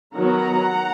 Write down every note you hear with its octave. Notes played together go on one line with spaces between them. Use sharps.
D#3 F#3 B3 F#5 A#5